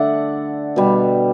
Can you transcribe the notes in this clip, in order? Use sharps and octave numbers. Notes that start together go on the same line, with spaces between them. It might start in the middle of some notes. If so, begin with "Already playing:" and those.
Already playing: D3 A3 D5 E5 F#5
B2 G3